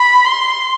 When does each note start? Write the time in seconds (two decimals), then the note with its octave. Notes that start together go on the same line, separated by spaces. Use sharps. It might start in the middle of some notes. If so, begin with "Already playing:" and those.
Already playing: B5
0.26 C6